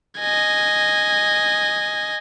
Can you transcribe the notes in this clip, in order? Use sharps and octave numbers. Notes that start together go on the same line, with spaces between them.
D#5 G#5